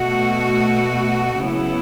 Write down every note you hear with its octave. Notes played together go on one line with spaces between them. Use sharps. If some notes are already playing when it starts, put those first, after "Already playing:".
Already playing: B2 A3 F#4
C#3 F#3 B3 E4